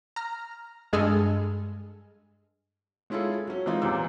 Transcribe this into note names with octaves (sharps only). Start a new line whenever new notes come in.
A#5 F6
G2 G#3 G#4 A4 G#5 F6
G#3 C#4 E4 F4 G#4 A4
F#3 C#4
E3 G#3 C4 D#4 F4
E2 A#2 G3 A#3 D6 E6